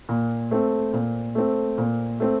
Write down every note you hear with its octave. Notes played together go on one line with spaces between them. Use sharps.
A#2
A3 C4
A#2
A3 C4
A#2
A3 C4